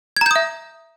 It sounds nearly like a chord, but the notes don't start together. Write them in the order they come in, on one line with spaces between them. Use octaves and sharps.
G#6 A#5 G6 D#6 E5